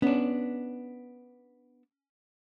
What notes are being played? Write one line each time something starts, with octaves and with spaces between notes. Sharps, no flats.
B3 C#4 D4